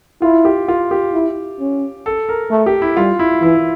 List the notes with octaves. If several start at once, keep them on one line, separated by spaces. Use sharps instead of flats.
E4 F4
G4
F4
G4
E4
C#4
A4
A#4
A3
G4
E4
G3 F4
E4
E3 E4